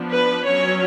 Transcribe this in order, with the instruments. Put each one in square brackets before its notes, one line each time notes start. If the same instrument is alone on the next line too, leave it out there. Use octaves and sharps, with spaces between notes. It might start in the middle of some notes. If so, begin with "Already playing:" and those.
Already playing: [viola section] F3 B3 D4
B4
F#3 C#4 C#5